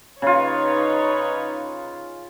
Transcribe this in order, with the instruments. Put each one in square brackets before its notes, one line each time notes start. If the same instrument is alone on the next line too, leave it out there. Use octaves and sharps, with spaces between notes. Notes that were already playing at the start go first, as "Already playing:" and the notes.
[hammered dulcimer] C#3 F4 [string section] D#4 B4 C#5